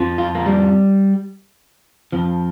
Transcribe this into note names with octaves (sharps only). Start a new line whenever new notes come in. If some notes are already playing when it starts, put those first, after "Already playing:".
Already playing: F2 F3
F4
A#3
G3
F2 F3